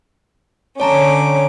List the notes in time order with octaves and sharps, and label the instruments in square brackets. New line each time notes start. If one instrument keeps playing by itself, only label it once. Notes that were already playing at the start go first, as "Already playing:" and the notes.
[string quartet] D3 C#4 D6 [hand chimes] C#5 A5 A#5